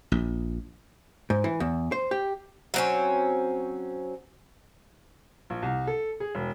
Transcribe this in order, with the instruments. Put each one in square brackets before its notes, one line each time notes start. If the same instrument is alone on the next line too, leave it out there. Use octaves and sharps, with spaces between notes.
[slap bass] A#1
[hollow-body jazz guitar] G#2
E3
E2
C5
G4
[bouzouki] F#3 C4 C#4
[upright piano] A#1
C2
A4
G#4
E1